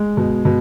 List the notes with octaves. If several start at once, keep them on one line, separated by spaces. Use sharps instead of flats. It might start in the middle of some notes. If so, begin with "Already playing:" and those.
Already playing: G#3
B2
B2